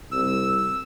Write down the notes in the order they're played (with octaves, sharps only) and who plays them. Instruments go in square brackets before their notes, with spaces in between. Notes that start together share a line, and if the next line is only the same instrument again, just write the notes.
[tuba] C2 [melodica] E6